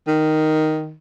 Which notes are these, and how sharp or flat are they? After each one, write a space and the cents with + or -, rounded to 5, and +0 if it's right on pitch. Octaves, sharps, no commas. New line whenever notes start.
D#3 +0